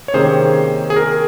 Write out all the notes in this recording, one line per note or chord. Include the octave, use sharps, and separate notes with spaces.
C#5
C3 D#3 A#3 C#4 G#4 C5
G#4
A#4